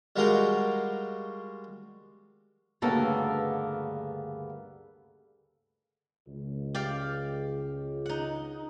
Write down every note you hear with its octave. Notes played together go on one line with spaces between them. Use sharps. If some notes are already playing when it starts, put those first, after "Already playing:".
G3 G#3 F#4 A#4 F5 G5
D2 G2 C#3 A#3 B3 A4
C#2
G4 D5 F5
D#4 F#5